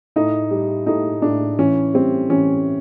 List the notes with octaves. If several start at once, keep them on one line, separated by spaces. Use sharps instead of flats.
A2 D#4
G3
A2 D#4
A2 D4
E3 C#4
G3 C4
E3 C#4